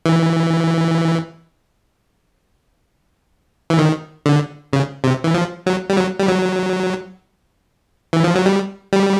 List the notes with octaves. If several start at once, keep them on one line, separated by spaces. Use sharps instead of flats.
E3
E3
D#3
D3
C#3
C3
E3
F3
F#3
G3
F#3
G3
F#3
E3
F3
F#3
G3
G3